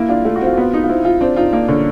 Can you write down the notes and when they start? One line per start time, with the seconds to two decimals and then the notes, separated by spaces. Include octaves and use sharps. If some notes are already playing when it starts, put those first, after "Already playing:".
Already playing: A#3 E4
0.09 D4 F4
0.25 A3 F4
0.36 F#4
0.41 C4 F4
0.54 F#4
0.57 B3 F4
0.73 D#4
0.84 F4
0.89 C4 E4
1.05 F4
1.21 C4 D4
1.36 D#4 F4
1.53 A#3 D4
1.68 D3 C#4